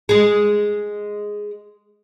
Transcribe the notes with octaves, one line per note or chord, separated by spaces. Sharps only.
G#3 G#4